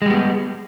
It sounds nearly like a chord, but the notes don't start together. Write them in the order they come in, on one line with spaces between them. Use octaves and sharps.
G#3 G3 B3